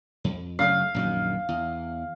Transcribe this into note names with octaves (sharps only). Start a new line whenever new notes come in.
F2
F#2 C#3 A3 F5
A#1 F#2 D#3
E2